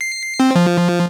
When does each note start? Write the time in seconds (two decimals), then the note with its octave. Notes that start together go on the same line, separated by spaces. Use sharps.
0.01 C7
0.40 C4
0.55 F3